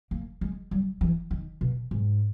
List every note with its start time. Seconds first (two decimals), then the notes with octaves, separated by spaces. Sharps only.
0.11 A#3
0.41 G#3
0.71 G3
1.01 E3
1.31 D#3
1.61 B2
1.91 G#2